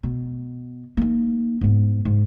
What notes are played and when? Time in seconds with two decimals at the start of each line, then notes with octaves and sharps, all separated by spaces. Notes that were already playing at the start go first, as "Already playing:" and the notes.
0.03 B2
0.97 A#3 D#4
1.61 G#2 B3
2.05 G#2